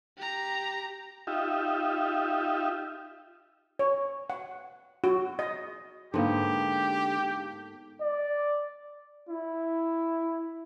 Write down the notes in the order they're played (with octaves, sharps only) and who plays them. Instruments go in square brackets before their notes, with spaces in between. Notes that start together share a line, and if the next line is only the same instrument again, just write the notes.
[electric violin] G4 A#5
[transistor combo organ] D#4 F4 G4 E5
[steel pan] C#5
F#5
F#4
D#5
[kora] G#2 B3 [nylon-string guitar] D3 [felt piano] A#3 F5 [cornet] G4
[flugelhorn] D5
[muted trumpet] E4